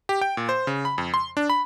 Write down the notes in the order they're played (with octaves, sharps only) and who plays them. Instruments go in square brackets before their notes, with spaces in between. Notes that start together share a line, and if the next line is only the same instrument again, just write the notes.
[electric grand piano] G4
G5
A#2
C5
C#3
B5
F2
C6
D4
B5